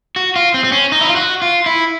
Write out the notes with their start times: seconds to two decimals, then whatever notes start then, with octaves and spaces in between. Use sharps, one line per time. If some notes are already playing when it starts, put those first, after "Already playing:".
0.16 F#4
0.36 F4
0.54 C4
0.64 C4
0.72 C#4
0.92 D#4
1.01 E4
1.09 F4
1.16 F#4
1.42 F4
1.66 E4